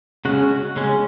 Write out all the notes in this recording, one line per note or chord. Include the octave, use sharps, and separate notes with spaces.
C#3 G#3 C#4 F#4
C#3 G#3 C#4